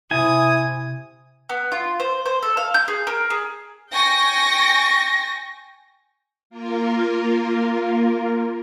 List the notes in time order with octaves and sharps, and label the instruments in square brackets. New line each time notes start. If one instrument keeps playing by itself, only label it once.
[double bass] C3 [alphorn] E4 [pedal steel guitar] G#5 [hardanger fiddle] D#6
[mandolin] B3
F4
C5
C5
A4
F5
G6
G#4
A#4
G#4
[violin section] G5 G#5 C#6 A#6
[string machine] A#3 F4 A#4